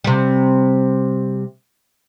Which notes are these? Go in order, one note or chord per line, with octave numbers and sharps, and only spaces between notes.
C3 G3